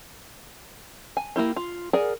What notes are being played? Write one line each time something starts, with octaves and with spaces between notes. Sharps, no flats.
G#5
A#3 D#4 E4 G4
F4
G#4 A#4 D5 F#5 G#5